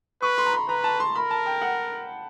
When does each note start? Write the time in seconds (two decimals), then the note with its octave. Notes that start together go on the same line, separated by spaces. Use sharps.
0.22 B4 C#6
0.38 C6
0.46 A#5
0.54 B5
0.69 B4 A#5
0.84 A5
1.00 C6
1.15 A#4 B5
1.31 A5
1.46 G5
1.61 F#5